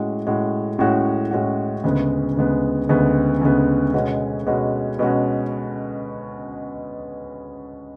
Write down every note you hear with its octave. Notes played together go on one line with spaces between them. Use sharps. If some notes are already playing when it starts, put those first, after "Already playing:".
Already playing: A2 G#3 C#4 F#4
A2 G#3 C#4 F#4
A2 G#3 C#4 F#4
A2 G#3 C#4 F#4
D2 C#3 G#3 B3
D2 C#3 G#3 B3
D2 C#3 G#3 B3
D2 C#3 G#3 B3
B2 G#3 C#4 F#4
B2 G#3 C#4 F#4
B2 G#3 C#4 F#4